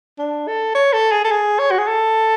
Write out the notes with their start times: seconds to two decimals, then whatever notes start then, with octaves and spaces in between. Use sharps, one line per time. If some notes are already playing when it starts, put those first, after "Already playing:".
0.19 D4
0.48 A4
0.75 C#5
0.93 A4
1.12 G#4
1.25 A4
1.32 G#4
1.59 C#5
1.71 F#4
1.78 G#4
1.88 A4